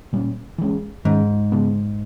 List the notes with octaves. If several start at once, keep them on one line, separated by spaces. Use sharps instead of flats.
A#2 G3 C#4
E3 G#3 C#4
G#2 D#3 G#3 C#4
C#3 G#3 B3